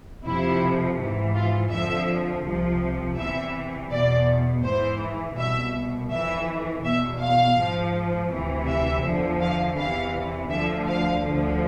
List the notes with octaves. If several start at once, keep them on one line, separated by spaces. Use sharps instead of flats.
F2 C3 F3 E4
G#2 E3
F4
F2 D3 F3 E5
C2 C3 F3
E2 C3 E3 E5
E2 B2 D5
G#2 E3 C5
C2 B2 E5
F2 E3 E5
E2 B2 E5
F5
G#2 F3
D2 C3 E3
E5
E2 D3 F3
F5
E2 C3 E3 F5
D2 D3 F3 E5
F5
D2 D3 F3